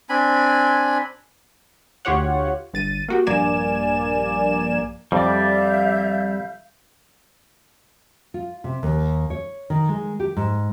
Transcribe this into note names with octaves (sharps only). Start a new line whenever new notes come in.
C4 D4 G#5 B5
D2 F4 G4 C#5 F#5
G1 A6 D#7
A#3 F#4 G4
A#1 G2 A#3 D5 G#5 E7
F2 G3 D5 E5 F5 G6
F4
C3
D#2
C#5
D#3
G#3
G4
G#2